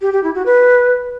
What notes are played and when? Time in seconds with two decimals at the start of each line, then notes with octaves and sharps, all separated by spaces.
0.01 G4
0.13 G4
0.24 E4
0.35 F#4
0.46 B4